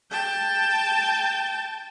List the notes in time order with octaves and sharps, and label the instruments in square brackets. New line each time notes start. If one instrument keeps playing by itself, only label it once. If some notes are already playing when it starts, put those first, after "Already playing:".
[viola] G5 A5